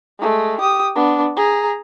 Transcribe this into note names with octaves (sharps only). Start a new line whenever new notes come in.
G#3 A3
G4 D#6
B3 D4
G#4 A#5